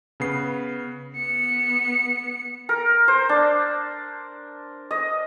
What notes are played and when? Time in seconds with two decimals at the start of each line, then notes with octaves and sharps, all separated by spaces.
0.20 C#3 B3 C7
1.16 B3 C#7
2.69 A#4
3.08 C5
3.29 D4
4.91 D#5